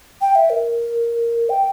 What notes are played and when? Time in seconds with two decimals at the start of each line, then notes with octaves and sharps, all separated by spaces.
0.21 G5
0.35 E5
0.50 A#4
1.49 G5